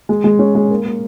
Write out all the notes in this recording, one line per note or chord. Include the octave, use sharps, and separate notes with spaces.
G#3
G#3
C#4
G#3
A#3
A#3